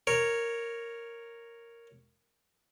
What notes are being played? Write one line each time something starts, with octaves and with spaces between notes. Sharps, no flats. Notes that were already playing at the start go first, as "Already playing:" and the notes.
A#4 C#5